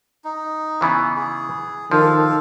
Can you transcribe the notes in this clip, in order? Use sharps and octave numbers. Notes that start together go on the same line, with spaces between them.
D#4
C#3 E3 B3
G#4
D#3 F3 A4 F5